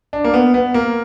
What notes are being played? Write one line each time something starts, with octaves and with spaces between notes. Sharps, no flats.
D4
A#3
B3
B3
A#3